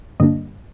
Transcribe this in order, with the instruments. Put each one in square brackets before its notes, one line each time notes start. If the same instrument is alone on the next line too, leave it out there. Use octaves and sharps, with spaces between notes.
[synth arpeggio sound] G2 D3 G3 A#3 D4 D#5